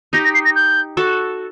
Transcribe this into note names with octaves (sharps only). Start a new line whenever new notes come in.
D#4 G4 A#6
A#6
C7
A#6
G6
F#4 A4